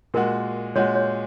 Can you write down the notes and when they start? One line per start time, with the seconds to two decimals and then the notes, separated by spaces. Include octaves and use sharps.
0.14 A#2 G#3 F#4 A#4
0.75 A#2 G#3 F#4 C#5
0.95 C#5